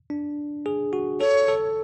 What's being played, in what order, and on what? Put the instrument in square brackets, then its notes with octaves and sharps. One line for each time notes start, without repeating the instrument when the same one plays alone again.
[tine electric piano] D4
G#4
F#4
[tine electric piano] A4 [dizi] C#5
[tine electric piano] A4